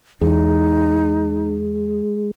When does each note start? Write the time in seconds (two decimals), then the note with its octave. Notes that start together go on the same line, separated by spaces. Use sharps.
0.21 E2 G#3 D#4